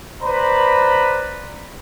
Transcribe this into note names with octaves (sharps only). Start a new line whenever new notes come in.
B4 C5 D5 A#5 B5